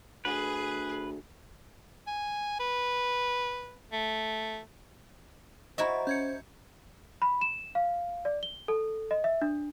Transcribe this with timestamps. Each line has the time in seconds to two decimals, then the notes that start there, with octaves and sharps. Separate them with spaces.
0.25 D2 G#4 B4
2.07 G#5
2.59 B4
3.92 A3
5.78 E4 F#4 C5 D#5 E5 A#5
6.07 C#4 G6 G#6 C#7
7.22 B5
7.41 E7
7.75 F5
8.25 D5
8.43 G7
8.68 A4
9.11 D#5
9.24 E5
9.41 D4